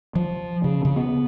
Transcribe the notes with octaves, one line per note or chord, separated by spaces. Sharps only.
F3
C#3
C#3
B3